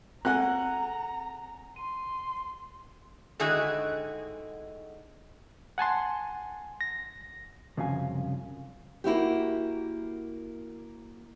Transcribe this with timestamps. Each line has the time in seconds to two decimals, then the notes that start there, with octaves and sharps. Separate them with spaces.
0.25 C4 G#4 A4 F#5 G#5 A#5 F#6
1.76 C6 D#7
3.39 G#2 D3 D#3 E4 F#4 G#4
5.78 F#5 G#5 A5 C6
6.81 A#6
7.77 C2 F#2 C#3 F3 F5 G#5
9.04 A#3 E4 F#4 G4